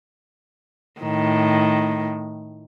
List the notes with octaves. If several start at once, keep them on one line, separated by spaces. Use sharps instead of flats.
A2 D#3